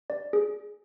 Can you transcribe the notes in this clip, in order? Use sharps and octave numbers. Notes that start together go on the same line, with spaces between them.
D5
G#4